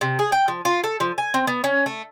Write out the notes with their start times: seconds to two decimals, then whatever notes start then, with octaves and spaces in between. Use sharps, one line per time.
0.01 C3
0.19 G#4
0.32 G5
0.48 F3
0.65 F4
0.84 A4
1.00 F3
1.18 G#5
1.34 C4
1.47 B3
1.64 C#4
1.86 A3